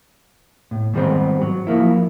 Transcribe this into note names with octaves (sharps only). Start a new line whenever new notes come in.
A2
G#2 D#3 G3 B3 C4
F#3
F3 F#3 A#3 E4